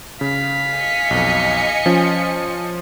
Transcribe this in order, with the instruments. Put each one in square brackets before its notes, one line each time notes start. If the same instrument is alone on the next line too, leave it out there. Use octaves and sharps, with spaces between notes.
[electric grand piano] C#3 [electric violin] F5 B6
[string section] D#5 G#5 C#7
[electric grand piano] B1 F2
F3 C#4 F4